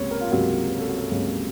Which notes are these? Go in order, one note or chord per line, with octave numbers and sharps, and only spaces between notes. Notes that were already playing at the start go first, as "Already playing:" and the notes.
Already playing: C#2 C3 A#3 C#5
A#4
F4
C#2 C3 F#3 A#3 F#4
A#4
A4
F#4
A4
C#2 C3 F#3 A#3